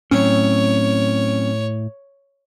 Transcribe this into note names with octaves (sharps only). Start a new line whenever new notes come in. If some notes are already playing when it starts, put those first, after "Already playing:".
A2 F#3 C4 C#4 C#5